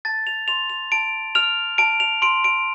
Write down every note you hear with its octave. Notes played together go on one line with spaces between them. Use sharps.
A5 A6
F7
C6 F7
F7
A5 D7
F6 F7
A5 D7
F7
C6 D7
D7